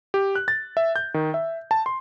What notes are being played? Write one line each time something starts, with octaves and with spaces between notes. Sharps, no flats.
G4
F#6
A6
E5
G6
D#3
E5
A5
C6